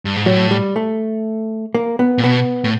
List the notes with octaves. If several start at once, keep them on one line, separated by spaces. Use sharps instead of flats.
G2
G#2
A2 F#3
G3
A3
A#3
B3
A#2
B2 B3
A2